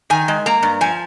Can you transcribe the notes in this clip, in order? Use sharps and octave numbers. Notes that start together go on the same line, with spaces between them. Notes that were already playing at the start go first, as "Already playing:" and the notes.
D#3 G#5
G#3
A#3 A#5
G2
F3 G#5